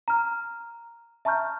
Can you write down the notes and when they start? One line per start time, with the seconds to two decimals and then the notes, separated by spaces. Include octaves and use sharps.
0.08 A#5 F6
1.25 E5 A5 A#5 C#6 F6 G6